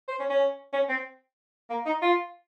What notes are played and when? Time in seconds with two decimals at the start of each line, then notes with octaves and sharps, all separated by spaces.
0.08 C5
0.19 C#4
0.30 C#4
0.73 C#4
0.89 C4
1.70 A#3
1.86 D#4
2.02 F4